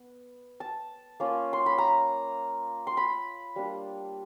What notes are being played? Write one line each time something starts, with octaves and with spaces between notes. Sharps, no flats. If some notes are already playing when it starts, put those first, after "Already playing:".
Already playing: B3
A5
A#3 C#4 F4
C6
B5
A#5
C6
B5
G3 A#3 D4